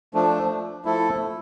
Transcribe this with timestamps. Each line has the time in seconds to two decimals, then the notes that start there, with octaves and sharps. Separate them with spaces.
0.14 F3 A3 D4
0.85 F3 A3 E4 A4